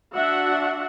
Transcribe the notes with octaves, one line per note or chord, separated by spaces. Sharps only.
D4 F#4 E5 F#5